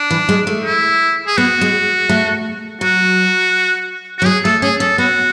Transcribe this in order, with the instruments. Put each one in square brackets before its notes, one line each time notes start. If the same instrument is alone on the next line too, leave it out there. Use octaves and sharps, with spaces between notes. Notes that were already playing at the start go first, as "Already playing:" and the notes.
Already playing: [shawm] D4
[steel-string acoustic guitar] E3
G#3
A3
[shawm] E4
G#4
[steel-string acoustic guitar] B3 [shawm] F#4
[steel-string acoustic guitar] G#3
A3
[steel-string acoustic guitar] F#3 [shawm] F#4
[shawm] F#4
[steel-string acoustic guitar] F#3
[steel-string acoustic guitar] G#3 [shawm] G#4
[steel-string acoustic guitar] A3 [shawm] A4
[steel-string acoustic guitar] C#4 [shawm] G#4
[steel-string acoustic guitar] C#4 [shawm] A4
[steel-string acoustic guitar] B3 [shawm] F#4